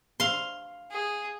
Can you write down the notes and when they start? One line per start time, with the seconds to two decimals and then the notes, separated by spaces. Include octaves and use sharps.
0.20 F5 C6
0.91 G#4